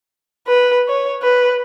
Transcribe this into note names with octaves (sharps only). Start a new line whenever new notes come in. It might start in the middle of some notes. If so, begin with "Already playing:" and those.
B4
C#5
B4